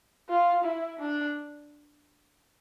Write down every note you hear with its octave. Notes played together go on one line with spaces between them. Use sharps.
F4
E4
D4